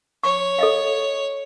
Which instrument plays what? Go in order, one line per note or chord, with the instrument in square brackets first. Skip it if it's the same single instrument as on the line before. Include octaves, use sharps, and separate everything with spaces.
[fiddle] C#5 [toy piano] C#6
[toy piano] A4 D#5 F5